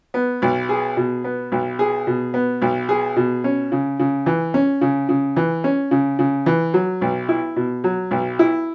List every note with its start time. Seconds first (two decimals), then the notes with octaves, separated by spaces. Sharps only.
0.14 B3
0.42 B1
0.69 G#4
0.97 B2
1.24 B3
1.52 B1
1.79 G#4
2.07 B2
2.34 B3
2.62 B1
2.89 G#4
3.16 B2
3.44 C#4
3.72 C#3
3.99 C#3
4.26 E3
4.54 C#4
4.81 C#3
5.09 C#3
5.36 E3
5.64 C#4
5.91 C#3
6.19 C#3
6.46 E3
6.74 F#3
7.01 B1
7.29 E4
7.56 B2
7.84 F#3
8.11 B1
8.39 E4